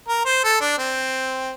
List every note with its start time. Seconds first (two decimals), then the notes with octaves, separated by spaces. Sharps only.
0.08 A#4
0.25 C5
0.44 A4
0.61 D4
0.78 C4